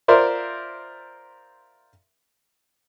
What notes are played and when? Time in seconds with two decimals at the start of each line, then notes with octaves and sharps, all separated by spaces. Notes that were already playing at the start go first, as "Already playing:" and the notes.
0.08 F4 A#4 C5 D5 E5